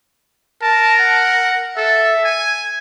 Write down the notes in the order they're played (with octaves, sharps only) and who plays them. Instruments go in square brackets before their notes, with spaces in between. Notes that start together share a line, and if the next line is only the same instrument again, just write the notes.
[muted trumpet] A#4 [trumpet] A5
[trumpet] F#5
[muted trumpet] A4 [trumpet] E5
[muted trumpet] G#5